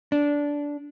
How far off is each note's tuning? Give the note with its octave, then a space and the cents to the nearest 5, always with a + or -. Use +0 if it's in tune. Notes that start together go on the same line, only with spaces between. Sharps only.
D4 -15